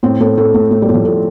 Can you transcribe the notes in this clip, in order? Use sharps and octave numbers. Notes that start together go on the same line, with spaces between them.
A2 C4
A2 A3
A2 A3
A2
A2
G3
A2
F3
A2 A3